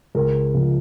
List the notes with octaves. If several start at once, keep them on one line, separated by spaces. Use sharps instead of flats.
C#2 A#4
C#3 F3